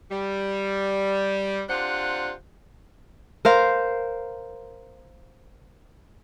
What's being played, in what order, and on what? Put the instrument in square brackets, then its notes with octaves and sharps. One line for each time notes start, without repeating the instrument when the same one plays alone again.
[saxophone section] G3
C3 D4 F4 C5 F#5
[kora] A#4 C5 F5